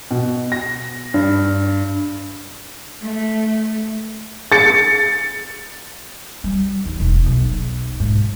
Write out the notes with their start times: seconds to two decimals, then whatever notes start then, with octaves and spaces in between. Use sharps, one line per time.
0.11 B2
0.52 A#6
1.14 G2
3.02 A3
4.52 A6 C#7
6.44 G3
6.85 D#2
7.00 E1
7.26 B1
8.00 G#2